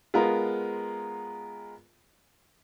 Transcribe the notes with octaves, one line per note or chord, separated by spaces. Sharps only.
G#3 B3 F4 A#4